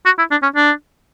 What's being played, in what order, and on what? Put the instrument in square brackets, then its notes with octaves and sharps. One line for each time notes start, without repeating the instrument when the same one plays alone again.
[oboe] F#4
E4
D4
C#4
D4